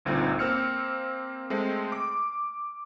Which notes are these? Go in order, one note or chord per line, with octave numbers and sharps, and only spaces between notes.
G1 D2 A#2 C4 D#4
A#3 C4 E6 F6 C#7
G#3 A3 C4
D6